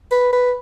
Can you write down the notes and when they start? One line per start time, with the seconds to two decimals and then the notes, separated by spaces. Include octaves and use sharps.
0.11 B4
0.33 B4